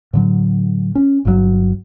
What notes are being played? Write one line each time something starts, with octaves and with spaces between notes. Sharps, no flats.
A2 D3 F#3
C#4
G1 G2 C3 F#3